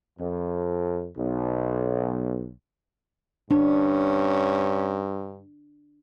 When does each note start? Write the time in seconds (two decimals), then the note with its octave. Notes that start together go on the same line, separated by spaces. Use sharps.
0.18 F2
1.17 B1
3.51 G2 C#4 D4